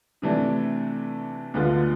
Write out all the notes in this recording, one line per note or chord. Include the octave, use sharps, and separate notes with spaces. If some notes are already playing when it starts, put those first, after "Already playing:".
C3 E3 A3 D4
D2 D3 G#3 B3 F4